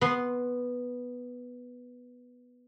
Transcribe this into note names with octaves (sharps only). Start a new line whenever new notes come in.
B3 C6